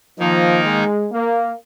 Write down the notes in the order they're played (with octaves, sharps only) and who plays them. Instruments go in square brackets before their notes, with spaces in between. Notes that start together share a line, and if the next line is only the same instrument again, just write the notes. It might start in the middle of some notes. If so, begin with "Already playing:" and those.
[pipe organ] D#3 A#3 D#4 [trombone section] F3
[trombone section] G#3
A#3